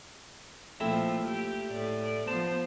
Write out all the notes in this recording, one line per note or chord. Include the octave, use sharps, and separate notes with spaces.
A#2 F3 A3 C4 E4
G4
A2 D5
F3 B3 C5 A5